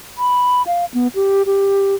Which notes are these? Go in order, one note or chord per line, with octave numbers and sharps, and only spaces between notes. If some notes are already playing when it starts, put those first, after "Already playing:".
B5
F5
B3
G4
G4